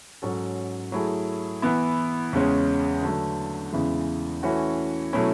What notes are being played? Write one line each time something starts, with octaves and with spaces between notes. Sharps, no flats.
G#2 F#3 C#4 F#4 A4
F#3 A3 E4 G#4
E3 B3 E4
E2 C#3 G#3 C#4
D3 F#3 A3
E2 C#3 E3 G#3
E3 A3 C#4 F#4
B2 F#3 A3 C#4 E4